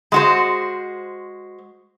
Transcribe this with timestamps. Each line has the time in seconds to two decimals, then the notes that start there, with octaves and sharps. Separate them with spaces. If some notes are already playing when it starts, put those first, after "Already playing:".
0.12 G#3 F#4 C5